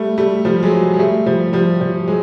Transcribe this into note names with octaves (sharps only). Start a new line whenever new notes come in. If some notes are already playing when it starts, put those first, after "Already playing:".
Already playing: G3 A3
G3 A3
F3 G3
F#3 G#3
G#3
G3 A3
F3 G3
F3 G3
F3
F#3 G#3